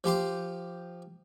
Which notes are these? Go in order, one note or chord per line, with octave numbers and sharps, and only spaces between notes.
F3 G4 C6 D6